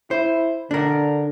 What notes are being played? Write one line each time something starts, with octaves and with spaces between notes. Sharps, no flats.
E4 C5
D3 D4 A#4